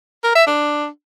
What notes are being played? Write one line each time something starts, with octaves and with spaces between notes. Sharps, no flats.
A#4
E5
D4